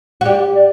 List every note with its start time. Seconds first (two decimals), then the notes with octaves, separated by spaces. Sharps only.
0.21 F#4
0.25 G4 D5
0.55 D5